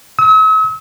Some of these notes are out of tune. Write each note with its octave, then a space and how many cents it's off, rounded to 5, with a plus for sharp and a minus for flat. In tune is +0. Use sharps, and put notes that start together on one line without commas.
E6 -45